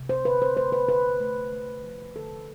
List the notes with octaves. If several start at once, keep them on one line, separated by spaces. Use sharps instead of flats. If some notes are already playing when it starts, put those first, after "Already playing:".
Already playing: C3
C5
D3 B4
C5
A3 C5
B4
D3 B4
A3
A3
F3
D3 A4